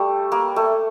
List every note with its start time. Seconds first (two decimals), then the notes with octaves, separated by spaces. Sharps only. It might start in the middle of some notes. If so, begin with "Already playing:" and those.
Already playing: G3 A3
0.32 A#3
0.56 A3